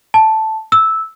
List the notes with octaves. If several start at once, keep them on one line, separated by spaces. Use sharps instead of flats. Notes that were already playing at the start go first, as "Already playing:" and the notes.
A5
E6